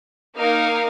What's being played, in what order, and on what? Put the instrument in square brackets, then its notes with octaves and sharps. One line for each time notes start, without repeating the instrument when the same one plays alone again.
[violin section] A#3 D#4 A#4 F5